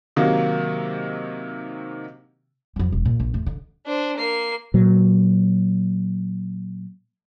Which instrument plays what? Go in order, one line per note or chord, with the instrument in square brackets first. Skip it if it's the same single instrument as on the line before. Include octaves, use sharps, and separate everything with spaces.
[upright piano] C3 D#3 F#3 A#3
[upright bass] F2 F#3
E1
A#2
A#1
E2 A2
D3
[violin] D4 C5
A#3 C7
[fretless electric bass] A#2 F#3